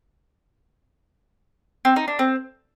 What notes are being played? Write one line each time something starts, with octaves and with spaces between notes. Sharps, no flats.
C4
D#4
D4
C4